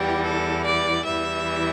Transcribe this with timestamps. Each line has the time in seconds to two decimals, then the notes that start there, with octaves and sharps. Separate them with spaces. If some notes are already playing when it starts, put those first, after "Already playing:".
Already playing: E2 E3 G3 G4
0.22 A4
0.64 D5
1.06 E2 E3 G3 E5